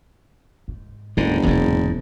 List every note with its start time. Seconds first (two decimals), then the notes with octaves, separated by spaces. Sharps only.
0.68 G#2
1.17 F#1 D2 G#2 D3
1.43 F1 E2 G#2 B2